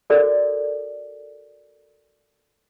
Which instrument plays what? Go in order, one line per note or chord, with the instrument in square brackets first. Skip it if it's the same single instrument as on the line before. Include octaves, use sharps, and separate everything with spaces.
[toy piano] F#4 A4 A#4 D5